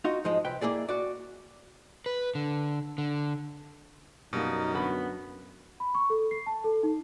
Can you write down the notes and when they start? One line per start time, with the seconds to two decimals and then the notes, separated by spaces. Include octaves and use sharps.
0.05 D#4 F4 F#4
0.24 G#2 F3 G#3 D#5
0.45 C2 B4 G5
0.61 A#3 E4 G#4 D5
0.89 F#4 D5
2.06 B4
2.35 D3
2.98 D3
4.33 F#2 B2 G3 A#3 D#4
4.74 D3 B3 F#4 B5
5.80 B5
5.95 C#6
6.10 A4
6.31 C7
6.46 A5
6.64 A4
6.83 D#4